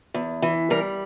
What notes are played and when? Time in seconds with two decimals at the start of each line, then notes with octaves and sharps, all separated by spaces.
0.14 E2
0.42 E3
0.70 G3 A#4